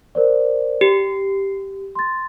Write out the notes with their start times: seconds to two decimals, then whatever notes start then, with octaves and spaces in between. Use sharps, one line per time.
0.15 A#4 C5 D5
0.81 G4 C7
1.95 C6 A6